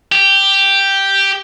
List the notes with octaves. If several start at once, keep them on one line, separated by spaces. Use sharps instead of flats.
G4